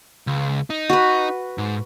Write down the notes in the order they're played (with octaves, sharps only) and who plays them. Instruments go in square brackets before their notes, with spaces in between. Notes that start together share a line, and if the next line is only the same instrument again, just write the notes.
[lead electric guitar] C#2
D#4
[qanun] F#4 B4
[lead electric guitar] G#2